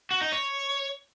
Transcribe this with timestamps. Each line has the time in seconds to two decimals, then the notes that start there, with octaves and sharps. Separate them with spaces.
0.11 F#4
0.21 D#4
0.32 C#5